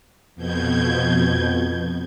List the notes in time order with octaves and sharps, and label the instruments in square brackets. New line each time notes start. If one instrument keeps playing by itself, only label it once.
[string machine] F2 B2 G6 G#6